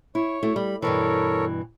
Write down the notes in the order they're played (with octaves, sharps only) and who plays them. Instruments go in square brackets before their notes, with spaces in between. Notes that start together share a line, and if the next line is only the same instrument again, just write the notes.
[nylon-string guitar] E4 [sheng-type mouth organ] C#5
[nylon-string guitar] A3 E4 F#4
[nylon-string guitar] G3 [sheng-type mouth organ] B5
[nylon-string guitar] G2 B2 E3 [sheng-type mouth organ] A4 A#4 C#5